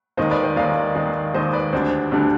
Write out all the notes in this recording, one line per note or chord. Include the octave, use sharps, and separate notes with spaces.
D#2 D#3 G#3 C5 D#5
B4 D5
C5 D#5
D#2 D#3 G#3 D5 F5
D#2 D#3 G#3
D#2 D#3 G#3 C5 D#5
B4 D5
D2 D3 G3 D4 C5
D2 D3 G3 D4